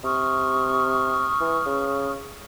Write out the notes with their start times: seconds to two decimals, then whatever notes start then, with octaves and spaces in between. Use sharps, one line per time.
0.04 C3 C#6 D#6 F6
1.40 E3
1.66 C#3